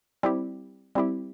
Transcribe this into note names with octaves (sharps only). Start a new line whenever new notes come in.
G3 C4 E4 G4
G3 C4 E4 G4